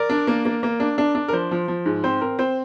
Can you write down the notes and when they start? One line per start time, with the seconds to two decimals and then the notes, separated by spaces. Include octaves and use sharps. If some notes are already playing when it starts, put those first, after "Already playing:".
Already playing: A#4 D5
0.10 D4
0.27 A#3
0.45 A#3
0.63 A#3
0.80 D4
0.98 D4
1.15 D4
1.28 A#4
1.32 F3 C5
1.51 F3
1.68 F3
1.86 G#2
2.04 C4 C5
2.21 C4 A#4
2.39 C4 C5